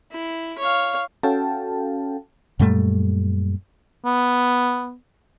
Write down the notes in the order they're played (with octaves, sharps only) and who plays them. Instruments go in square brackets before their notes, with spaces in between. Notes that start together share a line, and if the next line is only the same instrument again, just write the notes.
[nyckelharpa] E4
C#5 F5
[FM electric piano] C#4 F#4 A4 F5 G5 A5
[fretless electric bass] F#2 A#2 G3 A3
[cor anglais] B3